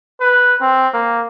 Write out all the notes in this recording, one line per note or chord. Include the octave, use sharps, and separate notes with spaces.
B4
C4
A#3